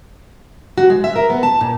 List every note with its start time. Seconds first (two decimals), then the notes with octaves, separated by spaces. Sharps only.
0.78 F#4
0.90 G#3
1.04 E5
1.16 A#4
1.30 B3
1.43 A5
1.61 A#2